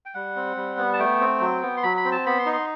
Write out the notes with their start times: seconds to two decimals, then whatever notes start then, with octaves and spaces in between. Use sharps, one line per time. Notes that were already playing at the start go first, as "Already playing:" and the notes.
0.06 G5
0.14 G3 F#5
0.36 C4
0.57 G3
0.78 B3
0.93 A5
0.99 A3 G5
1.21 C4
1.41 F#3
1.62 B3
1.77 C6
1.83 F#3 B5
1.97 B5
2.05 C4
2.12 A5
2.26 B3 B5
2.39 C6
2.46 D#4
2.53 C6